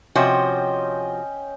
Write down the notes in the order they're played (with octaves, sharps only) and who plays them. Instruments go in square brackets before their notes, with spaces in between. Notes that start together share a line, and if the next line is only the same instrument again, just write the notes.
[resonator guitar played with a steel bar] C3 F3 F#4 [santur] C#4 D#5 G5